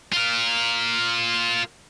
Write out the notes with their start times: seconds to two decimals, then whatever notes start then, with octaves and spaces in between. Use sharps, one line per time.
0.13 F4 A#4